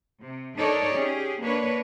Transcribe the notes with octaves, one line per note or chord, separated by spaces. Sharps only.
C3
D4 D#4 A4 A#4 C#5 D5
C#4 G4 G#4
A#3 D4 B4 C#5